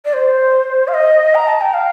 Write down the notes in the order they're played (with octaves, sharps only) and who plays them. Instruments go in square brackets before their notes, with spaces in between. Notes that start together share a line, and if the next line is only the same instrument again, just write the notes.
[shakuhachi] D5
C5
F5
D#5
A#5
A5
G5
F5